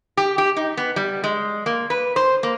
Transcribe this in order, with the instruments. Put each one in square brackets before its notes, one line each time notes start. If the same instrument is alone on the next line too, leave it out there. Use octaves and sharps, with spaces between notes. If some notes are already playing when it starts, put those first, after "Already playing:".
[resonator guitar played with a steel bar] G4
G4
D#4
B3
G3
G#3
A#3
B4
C5
A#3